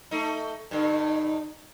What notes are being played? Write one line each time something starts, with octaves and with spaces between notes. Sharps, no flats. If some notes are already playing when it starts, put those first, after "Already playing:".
A3 D#4
G2 D3 D#4